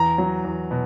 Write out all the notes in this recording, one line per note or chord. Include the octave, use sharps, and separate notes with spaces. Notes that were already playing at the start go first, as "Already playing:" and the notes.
Already playing: E2 A#5
F#3
E2
B2